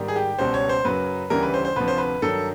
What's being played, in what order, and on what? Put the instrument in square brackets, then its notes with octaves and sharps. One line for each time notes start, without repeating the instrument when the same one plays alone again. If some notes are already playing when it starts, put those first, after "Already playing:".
Already playing: [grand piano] G#2 D#3 G3
G#4
G4
C#2 B2 G3 C5
C#5
C5
F#2 C#3 F#3 B4
D2 C#3 E3 G3 A#4
B4
C5
C5
D2 C3 F3 B4
C5
B4
G2 D#3 F#3 A4